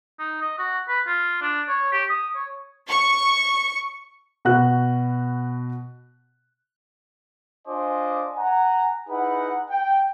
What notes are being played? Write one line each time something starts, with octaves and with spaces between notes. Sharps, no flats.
D#4
D#5
F#4
B4
F4
D4
C#5
G4
D#6
C#5
C#6
B2 F#4 F#6
D4 F4 C5 D#5 G#5 D6
F#5 G#5 A#5
D#4 E4 G#4 B4 F#5
G5